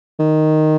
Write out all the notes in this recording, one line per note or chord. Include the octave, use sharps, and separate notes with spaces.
D#3